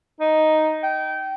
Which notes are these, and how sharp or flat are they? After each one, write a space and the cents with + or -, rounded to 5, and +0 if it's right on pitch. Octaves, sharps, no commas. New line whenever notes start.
D#4 +0
G5 -25